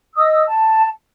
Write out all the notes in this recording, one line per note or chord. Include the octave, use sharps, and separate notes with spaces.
D#5 D#6 E6
A5